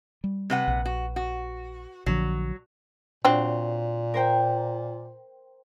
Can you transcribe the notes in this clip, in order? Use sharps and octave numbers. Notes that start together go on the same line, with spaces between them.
G3
C3 B4 F#5
A#1
F#4
F#4
A#1 D3 F3 F#3
A#2 F#3 C4 D4
A#4 C5 G5